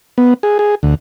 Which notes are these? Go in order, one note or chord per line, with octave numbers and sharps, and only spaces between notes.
B3
G#4
G#4
D2